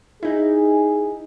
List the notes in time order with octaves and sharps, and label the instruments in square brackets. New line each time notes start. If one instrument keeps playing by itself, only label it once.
[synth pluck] D#4 E4 [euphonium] G#4